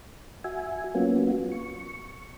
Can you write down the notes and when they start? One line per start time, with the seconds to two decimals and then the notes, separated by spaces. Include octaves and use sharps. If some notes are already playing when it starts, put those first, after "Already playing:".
0.44 F#4 E5 G#5
0.95 F#3 A#3 B3 C#4 F4 F#4
1.52 C#6